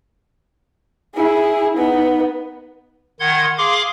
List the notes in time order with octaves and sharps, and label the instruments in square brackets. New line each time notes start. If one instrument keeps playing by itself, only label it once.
[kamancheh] E4 G#4
B3 D#4
[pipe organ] D#3 F#5 C6 G#6
G#4 F5 C6 D6